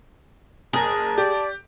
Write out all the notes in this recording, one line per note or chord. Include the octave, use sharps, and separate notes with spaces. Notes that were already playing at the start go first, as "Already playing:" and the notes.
F#1 G#4 A#4 A5
G4 D5